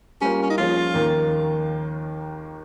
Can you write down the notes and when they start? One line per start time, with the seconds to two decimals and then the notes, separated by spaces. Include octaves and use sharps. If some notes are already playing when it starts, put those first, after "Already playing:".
0.21 G3 A#3 C#4 F4 A#4
0.43 C#4
0.50 D#4
0.58 F3 A#3 C#4 F4 G#4
0.94 D#2 D#3 A#3